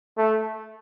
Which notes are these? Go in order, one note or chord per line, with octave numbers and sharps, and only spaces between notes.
A3